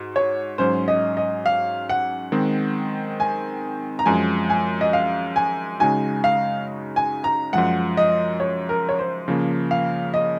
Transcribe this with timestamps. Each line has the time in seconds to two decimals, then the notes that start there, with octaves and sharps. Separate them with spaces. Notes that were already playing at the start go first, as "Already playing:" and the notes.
Already playing: G#2 F#4
0.16 C#5
0.58 G#2 F#3 C#4 C5
0.88 D#5
1.17 D#5
1.46 F5
1.89 F#5
2.32 D#3 G#3 C4
3.20 G#5
3.99 A#5
4.06 F#2 F3 G#3 G#5
4.50 G#5
4.81 D#5
4.93 F5
5.36 G#5
5.80 C#3 G#3 D#4 F#4 G#5
6.24 F5
6.96 G#5
7.24 A#5
7.53 F#2 F3 G#3 F#5
7.97 D#5
8.40 C#5
8.69 A#4
8.89 C#5
8.99 C5
9.28 C#3 F3 A#3
9.71 F5
10.14 D#5